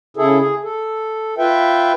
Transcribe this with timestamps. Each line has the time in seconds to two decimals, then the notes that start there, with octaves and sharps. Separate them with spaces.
0.17 C#3 E4 G#4 A4
0.39 G#4
0.64 A4
1.38 F4 B4 E5 G5